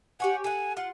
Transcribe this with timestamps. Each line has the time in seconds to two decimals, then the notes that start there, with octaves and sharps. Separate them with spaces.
0.20 G4 C#5 F#5 G#5
0.44 A4 F#5 G#5
0.77 F4 F#5